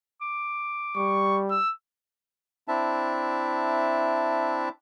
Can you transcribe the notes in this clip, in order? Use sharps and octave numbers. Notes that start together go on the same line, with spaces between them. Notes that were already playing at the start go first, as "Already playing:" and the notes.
D6
G3 C#6
E6
C4 D4 E4 E5 A5